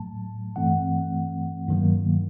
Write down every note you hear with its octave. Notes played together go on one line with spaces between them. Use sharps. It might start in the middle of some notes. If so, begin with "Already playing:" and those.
Already playing: A2 F#3 A3 A5
G2 E3 A3 C4 F#5
G2 D#3 F#3 A#3